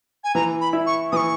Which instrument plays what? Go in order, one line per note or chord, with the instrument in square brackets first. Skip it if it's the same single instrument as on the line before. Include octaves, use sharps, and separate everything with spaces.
[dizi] G#5
[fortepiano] E3 [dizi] A#5
[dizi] B5
[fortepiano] E4
[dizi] C#6
[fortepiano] E3 [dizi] C#6 D#6